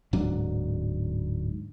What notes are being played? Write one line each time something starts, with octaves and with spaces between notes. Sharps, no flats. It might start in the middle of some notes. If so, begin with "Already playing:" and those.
D1 G#2 F#3 D4